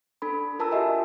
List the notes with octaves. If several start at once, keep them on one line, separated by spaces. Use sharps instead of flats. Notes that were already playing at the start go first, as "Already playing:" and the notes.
D4 A4 B5
F4 A#4 A5 A#5 E6
F#4 G4 D#5 E5 G#5